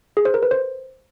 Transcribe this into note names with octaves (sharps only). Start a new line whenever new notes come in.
G#4
C5
A#4
B4
C5